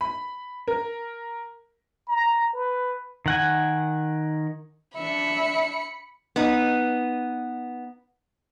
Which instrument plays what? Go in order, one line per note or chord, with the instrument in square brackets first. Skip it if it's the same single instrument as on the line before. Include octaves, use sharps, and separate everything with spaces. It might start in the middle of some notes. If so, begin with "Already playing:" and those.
[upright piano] B5
A#4
[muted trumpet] A#5
B4
[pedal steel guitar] D#3 F#5 G#5
[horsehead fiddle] D4 E5 [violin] B5 C#7
[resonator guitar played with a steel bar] B3 D#4